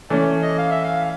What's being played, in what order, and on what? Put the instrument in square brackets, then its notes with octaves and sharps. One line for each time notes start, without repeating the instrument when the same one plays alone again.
[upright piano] E3 A3 C#4 [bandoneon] D5
[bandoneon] D#5
F5
E5
F5